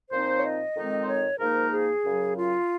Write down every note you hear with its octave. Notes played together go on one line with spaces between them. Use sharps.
A#2 F3 C4 D#4 C5
C#5
D#5
F2 D#3 G#3 C4 D#4
C5
C#5
G#2 F3 A#3 D#4 A#4
G#4
F#2 C#3 F#3
F4